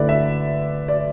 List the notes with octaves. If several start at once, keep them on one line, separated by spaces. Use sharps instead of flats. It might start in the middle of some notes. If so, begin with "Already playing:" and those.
Already playing: D3 A3 E4 B4 D5
E5
D5